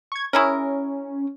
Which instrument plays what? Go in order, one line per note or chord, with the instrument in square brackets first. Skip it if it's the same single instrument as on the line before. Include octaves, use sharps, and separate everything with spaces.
[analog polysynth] C#6 G#6
[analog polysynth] C#4 [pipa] E4 G#4 A#4